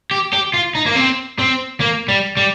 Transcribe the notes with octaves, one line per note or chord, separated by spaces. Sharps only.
G4
G4
F4
D#4
A#3
C4
C4
A#3
G3
G3